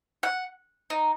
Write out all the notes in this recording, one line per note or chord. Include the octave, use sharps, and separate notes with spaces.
F#5
D#4